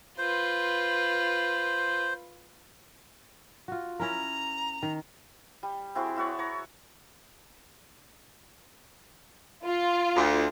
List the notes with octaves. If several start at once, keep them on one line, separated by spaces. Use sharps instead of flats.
F4 B4 C5
F4 F#4
C#4 E4 A#4 A#5
D#3
G3
C4 E4 F#4 G#4
E4 F#4 C#5 D5
C#5 A#5
F4
D2